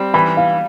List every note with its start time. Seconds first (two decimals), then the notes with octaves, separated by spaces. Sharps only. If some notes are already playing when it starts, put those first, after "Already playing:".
Already playing: G3 C4
0.14 E3 B5
0.37 F5